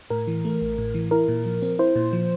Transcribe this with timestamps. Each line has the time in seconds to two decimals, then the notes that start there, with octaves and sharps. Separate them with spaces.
0.10 A2 A#4
0.28 E3
0.45 A3
0.61 A1
0.78 A2
0.94 E3
1.11 E4 A#4
1.28 A#2
1.45 F3
1.62 C4
1.79 E4 C5
1.96 A#2
2.13 F3